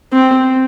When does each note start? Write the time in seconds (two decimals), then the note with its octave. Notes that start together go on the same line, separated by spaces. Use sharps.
0.13 C4